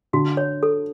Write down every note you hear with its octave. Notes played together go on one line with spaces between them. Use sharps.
D3 F#4
C#5
A4